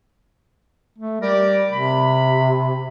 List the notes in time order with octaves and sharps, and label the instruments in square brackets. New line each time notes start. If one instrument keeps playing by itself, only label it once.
[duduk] A3
[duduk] G3 [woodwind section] G4 A#4 D5
[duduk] C3 [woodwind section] B5